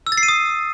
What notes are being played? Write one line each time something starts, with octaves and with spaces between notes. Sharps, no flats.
E6
A6
C7
D#7
D#6